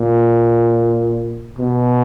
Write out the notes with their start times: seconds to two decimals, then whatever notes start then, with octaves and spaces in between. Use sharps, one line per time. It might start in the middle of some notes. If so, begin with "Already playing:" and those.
Already playing: A#2
1.58 B2